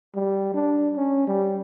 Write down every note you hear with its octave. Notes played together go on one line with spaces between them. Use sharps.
G3
D4
C#4
G3